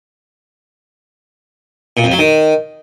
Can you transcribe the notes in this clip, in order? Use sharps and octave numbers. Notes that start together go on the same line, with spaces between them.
A#2
F2
F#3
D#3